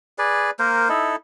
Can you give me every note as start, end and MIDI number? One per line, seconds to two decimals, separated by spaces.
0.18 0.50 68
0.18 0.50 71
0.18 0.50 74
0.59 0.89 58
0.59 0.89 70
0.59 0.89 72
0.89 1.16 63
0.89 1.16 64
0.89 1.16 69